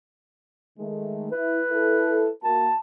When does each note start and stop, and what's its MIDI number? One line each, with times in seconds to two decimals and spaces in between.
0.78 1.30 51
0.78 1.30 56
0.78 1.30 57
1.32 1.59 64
1.32 2.33 71
1.71 2.28 64
1.71 2.28 69
2.44 2.68 58
2.44 2.68 66
2.44 2.78 81